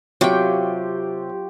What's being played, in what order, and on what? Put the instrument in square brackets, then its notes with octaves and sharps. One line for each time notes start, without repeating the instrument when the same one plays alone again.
[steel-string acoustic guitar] C3 [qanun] F#3 G5 [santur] F4 G4 C#6